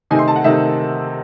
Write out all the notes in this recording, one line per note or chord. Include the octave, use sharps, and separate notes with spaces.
C3 D#3 A3 D#4 G#5
C6
A5
F#5
C3 D#3 A3 D#4 E5